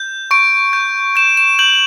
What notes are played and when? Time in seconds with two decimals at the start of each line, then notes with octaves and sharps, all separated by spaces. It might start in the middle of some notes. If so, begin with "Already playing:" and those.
Already playing: G6
0.31 C#6 D7
0.73 G6
1.16 G6 E7
1.37 E7
1.59 G6 F#7